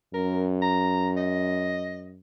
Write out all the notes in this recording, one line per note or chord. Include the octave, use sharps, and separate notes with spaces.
F#2 A#4
A#5
D#5